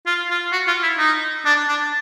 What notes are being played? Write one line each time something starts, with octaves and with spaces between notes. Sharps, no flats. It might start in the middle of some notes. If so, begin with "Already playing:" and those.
F4
F4
F#4
F4
E4
D#4
D4
D4